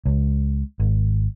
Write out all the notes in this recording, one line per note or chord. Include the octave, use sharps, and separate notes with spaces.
C#2
G#1